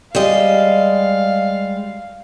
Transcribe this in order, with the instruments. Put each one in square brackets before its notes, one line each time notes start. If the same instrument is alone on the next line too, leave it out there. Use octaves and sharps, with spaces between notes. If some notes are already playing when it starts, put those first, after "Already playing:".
[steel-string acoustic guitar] G3 G#3 D#5 [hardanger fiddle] F5